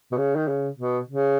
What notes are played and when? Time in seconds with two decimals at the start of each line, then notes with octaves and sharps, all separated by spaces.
0.11 B2
0.18 C#3
0.36 D#3
0.48 C#3
0.78 B2
1.09 C#3